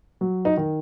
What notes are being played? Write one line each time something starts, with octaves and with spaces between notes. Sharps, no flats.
F#3
D#4
D#3